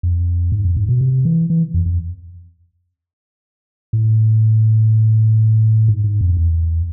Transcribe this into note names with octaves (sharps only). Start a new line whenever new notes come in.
F2
G#2
F2
G#2
B2
C3
E3
E3
F2
F2
A2
G#2
G#2
F2
E2